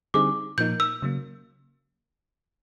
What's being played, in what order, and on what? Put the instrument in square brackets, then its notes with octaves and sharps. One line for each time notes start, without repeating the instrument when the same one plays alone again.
[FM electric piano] D3 G3 C4 D#4 G#4 [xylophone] D6
[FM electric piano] A#2 F3 A#3 D#4 [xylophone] G6
[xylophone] E6
[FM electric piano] C#3 F#3 A#3